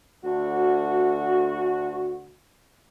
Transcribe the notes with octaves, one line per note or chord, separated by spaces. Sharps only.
D2 F#4